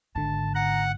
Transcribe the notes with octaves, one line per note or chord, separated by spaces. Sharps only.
G#1 G#2 D3 A5
F#5 A#5